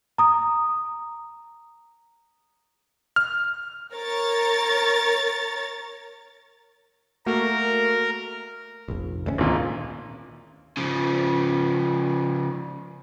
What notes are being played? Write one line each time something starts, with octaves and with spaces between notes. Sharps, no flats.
A#5 D#6
F6
A#4 C#5 A#5 A6
A3 A#3 F#4 A#4
F1 A#1
D2 G#3 C#4
G#1 A#2
C#3 F3